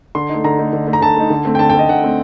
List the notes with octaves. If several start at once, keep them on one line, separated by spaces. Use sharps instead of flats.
D3 C6
A3 D#4
D3 A#5
A3 D#4
D3
A3 D#4
A#5
D3 A5
A3 D#4
D3
A3 C4
G5
D3 A5
G5
A3 C4 D#5
D3 F#5
A3 C4